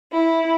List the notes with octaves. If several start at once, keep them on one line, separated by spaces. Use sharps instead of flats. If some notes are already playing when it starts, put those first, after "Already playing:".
E4